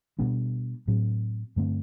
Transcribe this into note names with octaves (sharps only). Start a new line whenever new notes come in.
B2 G3 B3 D4
A2 F#3 C4
G2 D3 A3 C4